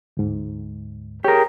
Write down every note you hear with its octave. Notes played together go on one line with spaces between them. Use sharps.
D2 G#2
G4 G#4 A#4 C#5